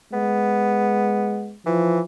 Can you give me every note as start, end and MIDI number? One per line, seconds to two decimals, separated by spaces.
0.13 1.57 56
0.13 1.51 59
1.66 2.00 52
1.66 2.02 53